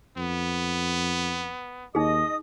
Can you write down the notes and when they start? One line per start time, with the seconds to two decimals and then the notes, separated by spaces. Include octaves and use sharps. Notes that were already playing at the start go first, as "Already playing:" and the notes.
0.17 F2 B3
1.95 D#2 D#4 G#4 D#5 D#6